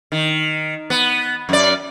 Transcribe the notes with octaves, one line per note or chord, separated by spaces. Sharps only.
D#3
B3
F#2 D5